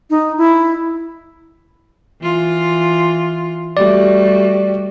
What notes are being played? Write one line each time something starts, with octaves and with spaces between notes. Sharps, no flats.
D#4
E4
E3 F4
G3 A3 F#4 D5